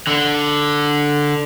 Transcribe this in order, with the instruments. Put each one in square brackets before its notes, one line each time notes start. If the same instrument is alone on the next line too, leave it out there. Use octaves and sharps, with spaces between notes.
[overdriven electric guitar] D3